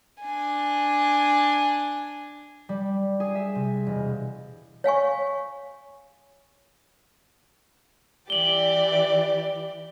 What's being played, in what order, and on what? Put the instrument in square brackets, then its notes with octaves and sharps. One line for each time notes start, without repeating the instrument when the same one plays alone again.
[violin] D4 G#5
[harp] G3
G#4
E5
C3
E1
[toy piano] C#5 F5 G#5 C#6
[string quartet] E3 G4 D5 [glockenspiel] F#7 G7